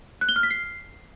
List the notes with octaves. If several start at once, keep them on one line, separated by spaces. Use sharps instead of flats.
F#6
G7
F6
B6
C7